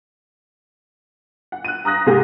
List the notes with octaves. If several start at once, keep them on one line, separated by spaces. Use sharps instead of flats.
F#5
F#6 D#7
A#5 D#6 F#6 A#6
G#2 C3 G#3 A#3 G4 G#4